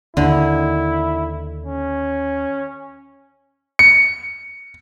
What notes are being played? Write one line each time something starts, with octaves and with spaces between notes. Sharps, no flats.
D#2 D3 E4
C#4
C#7